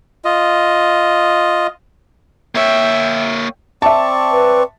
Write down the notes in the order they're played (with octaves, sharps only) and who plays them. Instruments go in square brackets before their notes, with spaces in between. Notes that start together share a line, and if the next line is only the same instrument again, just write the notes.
[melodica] F4 D#5
[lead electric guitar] A#3 C#5 [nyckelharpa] E5 G5
[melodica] C4 D5 C#6 [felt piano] E5 A5
[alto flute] B4